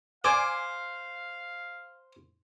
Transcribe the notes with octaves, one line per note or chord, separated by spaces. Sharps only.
C5 D5 F5 G#5 D6